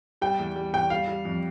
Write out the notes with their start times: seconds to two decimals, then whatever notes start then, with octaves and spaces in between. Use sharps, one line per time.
0.21 G3 G5
0.39 E2
0.55 G3
0.73 E2 G5
0.90 G3 F5
1.08 G3
1.25 F2